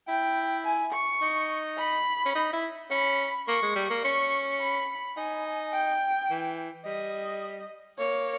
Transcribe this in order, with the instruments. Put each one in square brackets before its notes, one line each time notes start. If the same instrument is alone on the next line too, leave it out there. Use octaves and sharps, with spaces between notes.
[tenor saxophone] E4 [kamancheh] G5
[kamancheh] G#5
C#6
[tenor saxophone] D#4
[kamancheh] B5
[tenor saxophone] C#4
D#4
E4
[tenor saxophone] C#4 [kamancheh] B5
[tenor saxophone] A#3 [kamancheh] C#6
[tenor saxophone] G#3
G3
A#3
[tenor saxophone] C#4 [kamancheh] C#6
[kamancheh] B5
[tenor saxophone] D#4 [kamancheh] G#5
[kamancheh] G5
[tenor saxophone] E3
[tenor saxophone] G3 [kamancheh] D#5
[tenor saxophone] A#3 [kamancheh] C#5